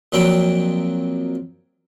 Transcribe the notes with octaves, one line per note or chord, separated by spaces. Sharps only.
F2 A#2 F#3 C4 G5 B5